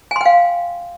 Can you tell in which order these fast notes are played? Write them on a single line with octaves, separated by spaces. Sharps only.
G#5 C6 G5 F5